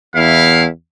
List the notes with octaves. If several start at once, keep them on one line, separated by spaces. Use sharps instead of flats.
E2 E4 F5